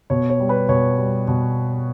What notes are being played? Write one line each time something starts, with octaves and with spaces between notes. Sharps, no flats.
B2 C#5
C#5
G3
B4
B2 C#5
G3
B2